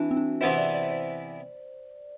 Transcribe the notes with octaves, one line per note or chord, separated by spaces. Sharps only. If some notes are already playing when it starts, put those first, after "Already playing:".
Already playing: E3 C4 D4 E4 F#4
C4
D4
C3 E3 B3 E4 C5
D5
D5
D5